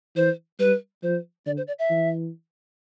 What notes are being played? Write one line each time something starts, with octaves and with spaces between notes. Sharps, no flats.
E3 C5
G3 B4
F3 C5
D3 D5
C5
D5
E5
E3